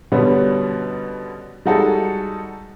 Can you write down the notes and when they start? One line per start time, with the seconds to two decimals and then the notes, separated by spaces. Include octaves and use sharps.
0.12 B2 D3 G3 B3 C#4
1.66 G3 G#3 D#4 F#4 G#4 A4